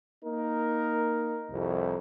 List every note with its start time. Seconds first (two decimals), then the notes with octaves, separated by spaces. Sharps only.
0.24 A#3 D#4 A#4
1.51 C2 F2